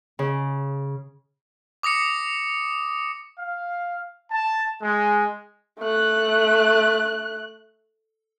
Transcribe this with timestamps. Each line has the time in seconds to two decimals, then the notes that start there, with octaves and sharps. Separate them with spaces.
0.19 C#3
1.83 D6 D#6 A#6 C#7
3.38 F5
4.32 A5
4.82 G#3
5.80 A3 F#6